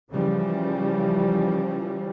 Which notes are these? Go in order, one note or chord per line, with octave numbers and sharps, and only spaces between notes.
C#3 E3 F3 G3